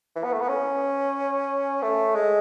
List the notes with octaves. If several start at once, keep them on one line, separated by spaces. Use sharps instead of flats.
E3
B3
A3
B3
C#4
A3
G#3